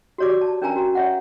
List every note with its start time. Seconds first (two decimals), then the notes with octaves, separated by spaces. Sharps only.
0.18 F#4 G4 C#5 D5 D6
0.41 A5
0.62 C#4 D4 A#4 G5 G#5 A#5
0.76 F#4
0.95 C#5 E5 F#5